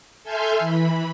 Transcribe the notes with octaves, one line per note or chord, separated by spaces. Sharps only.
A4 E5 G#5 C6 F6 G6
E3 B5